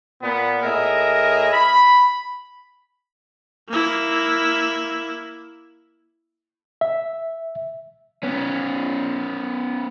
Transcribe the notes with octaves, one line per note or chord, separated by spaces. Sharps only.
A#2 A#3 B3
A2 G#4 A#4 D#5 E5
B5
A#3 E4
E5
B3 C#4